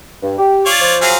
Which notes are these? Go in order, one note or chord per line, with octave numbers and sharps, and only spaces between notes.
G2
G4
F4 C#5 D5
F3 C5
F#3 G#4 F5